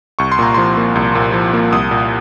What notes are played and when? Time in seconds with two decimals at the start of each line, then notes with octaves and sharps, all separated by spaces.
0.19 C2 C#6
0.32 C6
0.39 A#2 A#5
0.54 F3 C6
0.77 A#3
0.95 C2
1.15 A#2
1.33 F3
1.54 A#3
1.73 C2 D#6
1.91 A#2